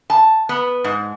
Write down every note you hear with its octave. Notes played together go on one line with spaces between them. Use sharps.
A5
B3
G#2